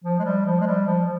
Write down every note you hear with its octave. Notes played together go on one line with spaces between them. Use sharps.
F3
G#3
G3
F3
G#3
G3
F3